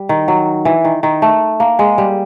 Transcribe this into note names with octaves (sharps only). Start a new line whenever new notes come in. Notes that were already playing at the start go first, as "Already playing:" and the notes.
Already playing: G3
D#3
F#3
E3
D#3
D#3
A3
A#3
G#3
G3